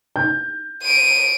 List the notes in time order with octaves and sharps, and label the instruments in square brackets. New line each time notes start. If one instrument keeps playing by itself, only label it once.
[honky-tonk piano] G6
[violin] D7 D#7